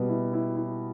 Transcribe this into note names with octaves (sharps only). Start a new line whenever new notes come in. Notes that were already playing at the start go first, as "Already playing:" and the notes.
Already playing: B2 G3 B3
E4
E4
E4